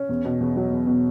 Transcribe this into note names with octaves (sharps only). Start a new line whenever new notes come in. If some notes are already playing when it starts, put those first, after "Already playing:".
Already playing: C#4
E2
B2
E2
F#3
E2
B2